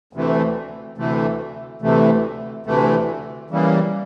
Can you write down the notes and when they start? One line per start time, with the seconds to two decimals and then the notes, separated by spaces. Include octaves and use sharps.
0.13 D2 C3 E3 A3
0.98 D2 C3 E3 A3
1.82 D2 C3 E3 A3
2.66 D2 C3 E3 A3
3.50 C#3 E3 G3 A#3